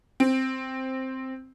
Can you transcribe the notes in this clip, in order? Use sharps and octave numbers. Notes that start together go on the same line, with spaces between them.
C4